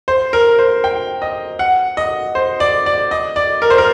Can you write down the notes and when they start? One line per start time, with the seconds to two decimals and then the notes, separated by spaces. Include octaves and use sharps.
0.08 C5
0.33 A#4
0.59 C5
0.84 G5
1.22 D#5
1.59 F#5
1.97 D#5
2.35 C5
2.60 D5
2.86 D5
3.11 D#5
3.36 D5
3.62 A#4
3.70 C5
3.78 A#4